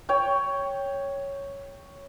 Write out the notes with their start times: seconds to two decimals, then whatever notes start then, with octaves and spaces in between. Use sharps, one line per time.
0.09 C#5 G5